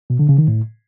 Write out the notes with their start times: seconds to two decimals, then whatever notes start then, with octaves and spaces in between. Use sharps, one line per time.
0.10 B2
0.19 D3
0.29 C#3
0.38 D#3
0.48 A2